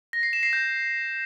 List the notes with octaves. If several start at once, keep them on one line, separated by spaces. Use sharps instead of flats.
A#6
C7
E7
C7
G6